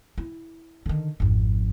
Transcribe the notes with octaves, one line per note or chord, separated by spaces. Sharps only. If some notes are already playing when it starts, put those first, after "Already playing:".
E4
D3 D#3
G#1 F2